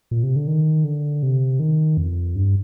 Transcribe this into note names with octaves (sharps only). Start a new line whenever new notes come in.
A#2
C3
D3
D#3
D3
C3
D#3
F2
G2